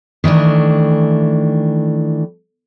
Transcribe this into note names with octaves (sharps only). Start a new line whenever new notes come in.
D#3 E3 A3 D4